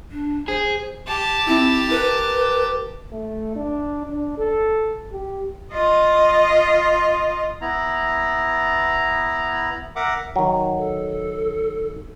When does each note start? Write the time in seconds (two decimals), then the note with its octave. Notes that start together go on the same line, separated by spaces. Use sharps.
0.12 D4
0.48 G#4 C5
1.07 G4 A5
1.48 C4 E4
1.91 A#4 B4
3.12 A3
3.56 D4
4.06 D4
4.38 A4
5.12 G4
5.72 F4 D#5
7.61 B3 E4 A#5
9.96 A#4 E5 F#5 D6
10.36 D#3 F#3
10.77 A4